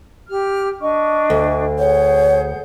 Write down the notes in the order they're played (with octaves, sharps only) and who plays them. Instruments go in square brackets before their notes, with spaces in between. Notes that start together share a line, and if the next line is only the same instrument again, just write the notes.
[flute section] G4 F6
D4 D#5 C#6
[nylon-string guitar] D2
[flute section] G#4 F#5 G6 [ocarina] C#5